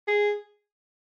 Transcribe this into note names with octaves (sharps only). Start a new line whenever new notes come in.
G#4